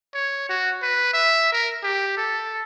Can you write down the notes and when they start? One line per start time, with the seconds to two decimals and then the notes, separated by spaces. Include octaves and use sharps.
0.15 C#5
0.49 F#4
0.82 B4
1.13 E5
1.52 A#4
1.83 G4
2.17 A4